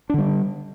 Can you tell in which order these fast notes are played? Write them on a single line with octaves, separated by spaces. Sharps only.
D4 D3 G3